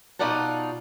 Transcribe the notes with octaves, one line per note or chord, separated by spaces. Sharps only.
B2 D#4 F4 D5 F#5 A5